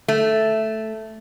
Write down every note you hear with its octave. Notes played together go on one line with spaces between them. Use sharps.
A3